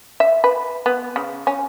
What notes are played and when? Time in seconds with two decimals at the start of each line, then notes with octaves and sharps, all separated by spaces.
0.20 E5
0.44 B4
0.86 B3
1.16 C#3
1.47 C#4